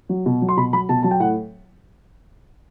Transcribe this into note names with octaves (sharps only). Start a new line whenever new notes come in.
F#3
B2
F#3
C6
B2 B5
F#3 B5
B2 A5
F#3 A5
G5
A2 F#5